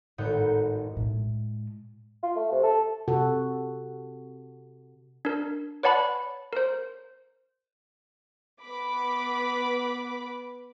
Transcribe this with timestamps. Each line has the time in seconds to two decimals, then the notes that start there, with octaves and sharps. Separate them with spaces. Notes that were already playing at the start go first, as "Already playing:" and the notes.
0.18 G#1 A2 D#4 F#4 G6 C#7
0.97 A2 G#3
2.23 F4
2.36 A3
2.52 C3
2.63 A4
3.08 C3 F#4 A4
5.25 D4 A#4
5.83 B4 C#5 D5 F#5 A5 B5
6.53 A#4 C5
8.64 B3 B4 B5 D6